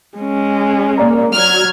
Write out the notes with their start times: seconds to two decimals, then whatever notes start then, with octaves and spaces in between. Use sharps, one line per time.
0.18 G#3 C#4
0.98 A#3 D5 A#5
1.35 F#3 F6 G#6